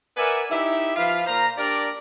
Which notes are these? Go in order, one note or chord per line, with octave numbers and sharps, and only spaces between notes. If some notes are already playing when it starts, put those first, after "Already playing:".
A#4 B4 D5 E5 F#5 G#5
D#4 E4 G4 E5
F3 F4 B4 F5
A#2 C5 F5 A#5
D4 G4 A#4 D5